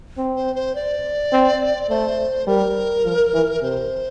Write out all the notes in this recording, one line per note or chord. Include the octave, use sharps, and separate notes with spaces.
C4
C5
C5
D5
C4
A3 C5
G3 A#4
F3
E3
C3 C5